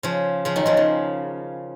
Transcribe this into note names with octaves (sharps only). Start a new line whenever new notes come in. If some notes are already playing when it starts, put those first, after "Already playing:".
C#3 F3
C#3 F3
D#3 F#3
C#3 F3
C#3